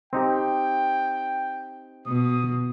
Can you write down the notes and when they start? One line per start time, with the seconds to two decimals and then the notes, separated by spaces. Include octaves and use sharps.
0.13 C4 D#4 G4 G5
2.07 B2 D#6